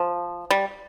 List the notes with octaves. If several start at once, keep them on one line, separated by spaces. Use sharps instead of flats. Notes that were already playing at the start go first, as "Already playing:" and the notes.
Already playing: F3
G3